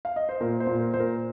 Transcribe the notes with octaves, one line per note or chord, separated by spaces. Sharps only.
F5
D#5
C5
A#2 A#4
C5
A#2
A#4
A#2 C5
A#4